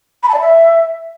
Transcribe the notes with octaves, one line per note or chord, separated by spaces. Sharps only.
B5
A5
D5
E5